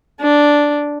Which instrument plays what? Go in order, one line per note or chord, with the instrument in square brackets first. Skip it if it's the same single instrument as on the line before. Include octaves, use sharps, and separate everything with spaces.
[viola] D4